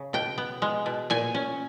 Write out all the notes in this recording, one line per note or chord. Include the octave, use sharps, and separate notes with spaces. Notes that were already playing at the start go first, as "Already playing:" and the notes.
Already playing: C#3
B2 G5
B3
G#3
B2
A#2 G#5
C#4